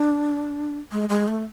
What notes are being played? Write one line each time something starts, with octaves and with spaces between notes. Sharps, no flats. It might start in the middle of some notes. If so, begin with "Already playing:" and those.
Already playing: D4
G#3
G#3
A3